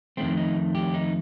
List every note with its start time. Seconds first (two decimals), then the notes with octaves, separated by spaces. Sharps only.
0.17 F2 D#3 A3 C4
0.37 D#4
0.75 G4
0.94 D#4